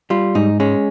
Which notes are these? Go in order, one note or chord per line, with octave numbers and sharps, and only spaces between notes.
G3 F4
G#2 D#4
G#3 C#4